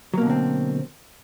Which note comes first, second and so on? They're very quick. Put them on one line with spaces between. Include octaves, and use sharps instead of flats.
F#3 A#3 B2 D3 C4